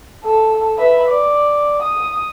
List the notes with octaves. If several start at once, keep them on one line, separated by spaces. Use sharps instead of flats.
A4
B4 E5
D5
D#6